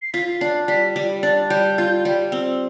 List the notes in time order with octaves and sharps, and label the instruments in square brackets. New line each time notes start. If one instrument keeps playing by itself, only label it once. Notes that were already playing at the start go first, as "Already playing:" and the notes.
[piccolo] C7
[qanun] F4 [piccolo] B6
[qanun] D4 [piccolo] C7
[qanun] G3 [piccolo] B6
[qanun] G3
[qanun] D4 [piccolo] A6
[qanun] G3 [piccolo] G6
[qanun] F4
G3
C4